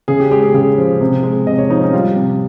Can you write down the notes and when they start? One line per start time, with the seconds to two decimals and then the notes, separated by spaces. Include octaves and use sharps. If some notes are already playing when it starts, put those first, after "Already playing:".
0.08 C#3 G#4
0.20 G4
0.31 G#3 G4
0.43 G#4
0.54 C#3 G#4
0.78 F3
1.01 C3
1.23 G#3
1.47 C3 D#5
1.58 C#5
1.70 F3 D#4
1.82 C#4
1.93 G3 F4
2.16 C3